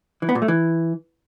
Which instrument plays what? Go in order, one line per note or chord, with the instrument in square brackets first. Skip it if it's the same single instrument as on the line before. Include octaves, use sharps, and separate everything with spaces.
[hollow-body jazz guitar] E3
B3
A#2
A3
E3